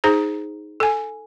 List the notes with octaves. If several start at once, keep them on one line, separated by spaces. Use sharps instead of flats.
D#4 G#4 C5 A#5
A4 G#5